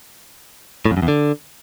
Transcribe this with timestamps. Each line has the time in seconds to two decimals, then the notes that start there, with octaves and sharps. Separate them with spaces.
0.86 A2
0.91 F2
0.97 F#2
1.02 E2
1.08 D3